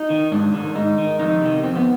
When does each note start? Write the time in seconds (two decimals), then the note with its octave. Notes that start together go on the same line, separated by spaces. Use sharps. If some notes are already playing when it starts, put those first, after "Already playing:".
Already playing: D#4
0.10 D#3
0.32 G#2 D4
0.54 D#3
0.75 G#2 D#4
0.98 D#3
1.20 F2 D#4
1.42 C3 D#3
1.63 F2 C4
1.76 B3